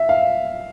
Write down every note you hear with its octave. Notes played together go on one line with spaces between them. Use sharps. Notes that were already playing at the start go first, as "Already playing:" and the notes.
Already playing: E5
F5